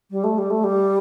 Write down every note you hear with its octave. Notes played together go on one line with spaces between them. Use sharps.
G3
A3
G3
A3
G3